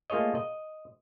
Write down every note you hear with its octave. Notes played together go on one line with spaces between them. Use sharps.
A3 A#3 F4 G#4 C#5 D#5
D#5